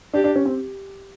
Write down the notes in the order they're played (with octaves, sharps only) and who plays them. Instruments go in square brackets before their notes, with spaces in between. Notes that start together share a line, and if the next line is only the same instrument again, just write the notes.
[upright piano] D4 [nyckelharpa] G4
[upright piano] D4
C#4
C4